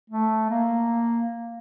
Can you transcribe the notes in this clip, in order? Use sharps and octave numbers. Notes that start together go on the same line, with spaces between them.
A3
A#3